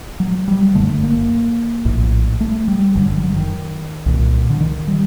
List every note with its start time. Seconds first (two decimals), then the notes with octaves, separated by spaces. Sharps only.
0.20 F#3
0.48 G3
0.75 G1 F#2 D3 A3
1.03 A#3
1.85 A#1 A2
2.41 A3
2.68 G3
2.95 G1 F#2 D3 F#3
3.09 F#3
3.17 G3
3.23 F#3
3.36 D#3
4.06 C2 A#2
4.50 D3
4.60 D#3
4.88 G3